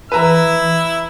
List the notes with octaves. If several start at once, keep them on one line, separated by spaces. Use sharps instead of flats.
E3 E4 B4 A#5 E6